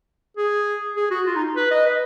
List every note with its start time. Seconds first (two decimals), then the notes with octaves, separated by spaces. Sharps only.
0.37 G#4
0.96 G#4
1.11 F#4
1.27 F4
1.36 D#4
1.56 B4
1.71 D#5
1.86 B4